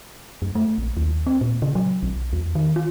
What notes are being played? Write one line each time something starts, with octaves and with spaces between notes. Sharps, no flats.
F#2
A3
A#1
D#2
C4
A#2
C#3
F#3
B1
E2
D#3
F4